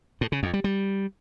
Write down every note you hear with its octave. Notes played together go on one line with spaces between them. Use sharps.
A2
C#3
F2
G3
G3